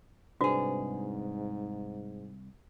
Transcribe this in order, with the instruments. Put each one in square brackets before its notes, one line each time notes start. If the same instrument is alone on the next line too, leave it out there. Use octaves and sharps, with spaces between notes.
[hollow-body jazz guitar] C2 G#4 [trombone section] G#2 [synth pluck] D4 B4 C5 [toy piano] F#4